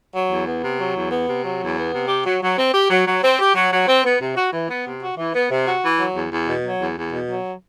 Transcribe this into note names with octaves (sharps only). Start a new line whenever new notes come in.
F#3
E2
B3
C3
F#3
E2
B3
C3
F#3
E2
B3
C3
G4
F#3
F#3
C4
G4
F#3
F#3
C4
G4
F#3
F#3
C4
B3
C3
F#4
E3
B3
C3
F#4
E3
B3
C3
F#4
E3
F#3
E2
E2
B2
F#3
E2
E2
B2
F#3